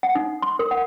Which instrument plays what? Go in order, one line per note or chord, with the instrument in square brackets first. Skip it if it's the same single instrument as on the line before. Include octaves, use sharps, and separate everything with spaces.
[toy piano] F#5
D#4
C6
A#4
F#5